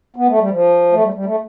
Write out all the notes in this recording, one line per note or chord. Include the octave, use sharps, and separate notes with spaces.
B3
A3
G3
F3
A3
G3
G3
A3